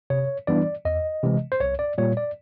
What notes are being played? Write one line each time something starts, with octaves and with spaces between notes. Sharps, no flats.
C3 C#5
E3 G3 B3 D4 D5
E2 D#5
C3 E3 G#3
C5
C2 C#5
D5
A#2 G3 C#5
D5